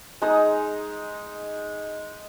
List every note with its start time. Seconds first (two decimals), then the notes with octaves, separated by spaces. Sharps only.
0.22 G#3 D#4 A#5